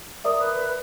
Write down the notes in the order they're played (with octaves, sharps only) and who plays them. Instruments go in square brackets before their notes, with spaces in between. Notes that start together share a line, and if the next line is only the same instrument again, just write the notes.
[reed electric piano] A#4 D5 E5 [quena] D#6
[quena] B4